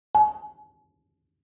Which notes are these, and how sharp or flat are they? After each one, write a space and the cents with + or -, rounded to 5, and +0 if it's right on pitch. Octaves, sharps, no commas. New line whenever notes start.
G#5 +45